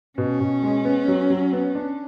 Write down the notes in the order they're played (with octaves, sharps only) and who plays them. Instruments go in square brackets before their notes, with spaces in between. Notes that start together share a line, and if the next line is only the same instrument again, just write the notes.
[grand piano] B2 [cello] C#4
[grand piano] B2
G#3
B3
F#3
F#3
B3
D4